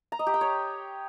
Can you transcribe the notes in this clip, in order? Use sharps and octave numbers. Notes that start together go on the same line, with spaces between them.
A#5
D#5
G4
G5
C#5